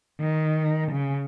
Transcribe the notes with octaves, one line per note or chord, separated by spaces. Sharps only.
D#3
C#3